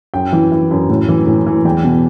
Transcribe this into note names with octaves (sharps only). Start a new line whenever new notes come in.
F#2 G5
E3
E3
F#2
A2
E3
A2
E3
E2 G5
B2